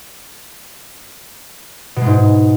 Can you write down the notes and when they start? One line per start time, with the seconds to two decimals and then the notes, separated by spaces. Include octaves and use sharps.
1.96 B2
2.01 G#3
2.06 G#2